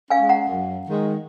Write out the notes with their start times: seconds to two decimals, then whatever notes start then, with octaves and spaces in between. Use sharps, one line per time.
0.10 C#4 F5 G#5
0.16 G#3
0.29 F#5 A#5
0.48 F#2
0.85 D#3 G#3